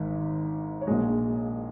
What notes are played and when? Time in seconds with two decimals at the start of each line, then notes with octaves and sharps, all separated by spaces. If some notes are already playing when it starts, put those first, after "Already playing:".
Already playing: G#1 G#2 D#3
0.81 C#5
0.87 A#1 A#2 G#3 D#5